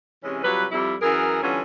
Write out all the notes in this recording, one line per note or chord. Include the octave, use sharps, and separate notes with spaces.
C3 E3 G#3 C#4
C3 F#3 G3 F4 B4
F2 G3 E4
F#2 E3 G#4 A#4
D3 E3 G3 B3 C#4 F4